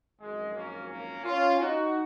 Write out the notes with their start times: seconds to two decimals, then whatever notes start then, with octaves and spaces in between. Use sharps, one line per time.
0.20 G#1 F#2 F3 G#3
0.55 A#3 C#4
0.89 A#3 C#4
1.24 C#4 F4
1.59 D#4 F#4